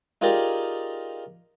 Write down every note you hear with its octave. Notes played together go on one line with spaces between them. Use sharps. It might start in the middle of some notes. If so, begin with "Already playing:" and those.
D#4 F4 G4 G#4 A#4 D5